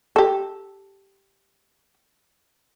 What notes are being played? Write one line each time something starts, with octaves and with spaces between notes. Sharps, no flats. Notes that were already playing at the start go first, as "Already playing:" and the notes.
G4 A4